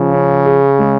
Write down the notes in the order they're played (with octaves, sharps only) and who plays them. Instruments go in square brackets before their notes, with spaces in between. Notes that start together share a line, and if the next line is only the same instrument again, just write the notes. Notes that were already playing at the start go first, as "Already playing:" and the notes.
Already playing: [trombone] C#3 [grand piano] F3
[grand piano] C#4
G#4
G#3